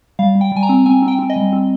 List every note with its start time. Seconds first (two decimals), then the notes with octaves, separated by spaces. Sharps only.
0.19 G3 F5
0.35 G3
0.41 G5
0.52 G3 G#5
0.63 A#5
0.69 C4
0.86 C4 G#5
1.02 C4
1.08 G5
1.19 C4
1.30 D#5
1.36 G3
1.53 C4